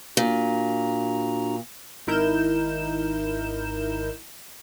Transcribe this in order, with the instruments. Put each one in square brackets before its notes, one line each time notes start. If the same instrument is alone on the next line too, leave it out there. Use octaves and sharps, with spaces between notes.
[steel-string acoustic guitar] A#2 [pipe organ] D4 F#4 A#5
[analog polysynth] G#1 D#4 E4 A#4 G6 E7